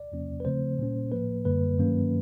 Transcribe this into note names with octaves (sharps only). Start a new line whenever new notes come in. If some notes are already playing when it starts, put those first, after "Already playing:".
Already playing: D5
E2 C3 F3 A#3 C#4
B4
C#3 F3 A3 C4 C5
A#2 G3 A#3 C#4
A2 F3 A#3 B4
F#2 D3 G3 A#3 B4
G2 D#3 F#3 A#3 C#4